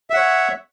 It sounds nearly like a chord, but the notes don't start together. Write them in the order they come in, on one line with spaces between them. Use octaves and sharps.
E5 F#5 C#5